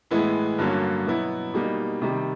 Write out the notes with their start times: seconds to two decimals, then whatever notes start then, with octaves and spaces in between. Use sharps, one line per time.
0.11 A2 E3 G#3 B3 E4
0.58 G2 D3 F#3 A#3 C#4
1.06 B2 F#3 B3 E4
1.54 B2 G3 A#3 D#4
2.01 C3 D#3 G3